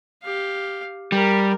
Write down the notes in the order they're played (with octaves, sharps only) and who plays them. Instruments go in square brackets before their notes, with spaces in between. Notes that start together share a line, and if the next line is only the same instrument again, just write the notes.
[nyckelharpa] G4 F5
[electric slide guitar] G3 [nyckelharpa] A#4